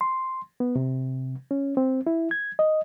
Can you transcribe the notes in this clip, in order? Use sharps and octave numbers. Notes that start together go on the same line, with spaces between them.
C6
B3
C3
C#4
C4
E4
G#6
D#5